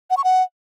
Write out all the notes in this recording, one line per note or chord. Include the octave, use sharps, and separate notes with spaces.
F#5
C#6
F#5